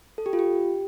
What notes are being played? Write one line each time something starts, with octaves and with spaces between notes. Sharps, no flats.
A4
G4
F4
G4